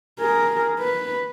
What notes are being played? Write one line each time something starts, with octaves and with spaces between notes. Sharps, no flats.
G#4 A#4
B4